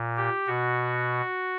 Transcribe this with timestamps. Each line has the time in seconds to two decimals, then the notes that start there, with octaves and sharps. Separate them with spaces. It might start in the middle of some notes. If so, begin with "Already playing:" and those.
Already playing: A#2
0.16 G4
0.47 B2 F#4